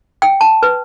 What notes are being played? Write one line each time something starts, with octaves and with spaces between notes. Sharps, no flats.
G5
A5
B4